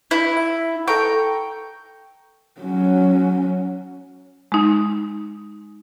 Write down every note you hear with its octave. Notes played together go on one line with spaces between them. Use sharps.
E4
E5
A4 G5 A#5 C#6
F#3 C#4
G#3 D#4